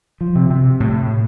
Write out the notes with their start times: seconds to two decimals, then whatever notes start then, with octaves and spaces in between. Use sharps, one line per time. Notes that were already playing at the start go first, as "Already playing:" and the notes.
0.21 F3
0.35 C3
0.50 C3
0.80 A2